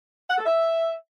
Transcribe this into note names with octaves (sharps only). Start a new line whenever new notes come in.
F#5
A4
E5